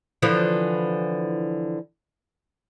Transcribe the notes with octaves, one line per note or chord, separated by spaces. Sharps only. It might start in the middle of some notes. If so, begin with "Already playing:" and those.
D3 E3 F3